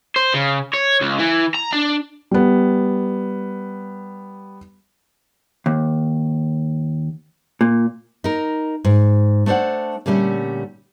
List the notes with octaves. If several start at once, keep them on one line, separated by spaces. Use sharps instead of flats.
C5
C#3
C#5
C#2
E3
A#5
D4
G3 B3
D#2
A#2
D#4 A#4
G#2
A3 D4 C5 D5 F#5
A#2 D3 G3 A3 C#4